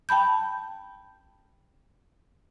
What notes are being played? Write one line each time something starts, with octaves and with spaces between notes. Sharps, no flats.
G5 A5 B5 G6